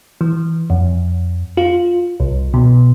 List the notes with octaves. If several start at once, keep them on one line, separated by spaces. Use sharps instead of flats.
E3
F2
F4
C2
B2